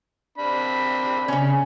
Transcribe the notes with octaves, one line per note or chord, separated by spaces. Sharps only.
C4 D4 B5
C#3 C#4